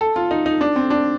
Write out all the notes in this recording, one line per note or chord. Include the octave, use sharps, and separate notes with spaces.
A4
F4
D#4
D#4
D4
C4
D4